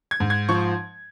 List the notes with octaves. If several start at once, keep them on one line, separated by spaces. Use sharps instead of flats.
G#6
G#2
G#6
F3 C#6